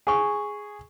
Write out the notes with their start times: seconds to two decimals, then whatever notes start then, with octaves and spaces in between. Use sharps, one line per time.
0.07 G#4 C#6